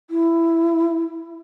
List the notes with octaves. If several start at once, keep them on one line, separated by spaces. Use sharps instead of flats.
E4